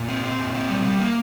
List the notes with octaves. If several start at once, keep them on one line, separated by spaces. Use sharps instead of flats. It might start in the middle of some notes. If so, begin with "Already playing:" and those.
Already playing: A#2
C4
C4
A#2
C4
G3
G3
A#3